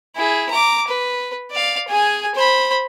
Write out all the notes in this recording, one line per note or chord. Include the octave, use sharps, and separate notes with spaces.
E4 G#4
A#5 D6
B4
D5 F5
G#4 G#5
C5 B5